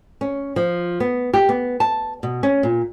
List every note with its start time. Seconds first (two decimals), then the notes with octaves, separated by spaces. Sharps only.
0.21 C#4
0.56 F3
1.00 B3
1.34 G4
1.49 B3
1.80 A5
2.23 B2
2.43 C#4
2.63 A#2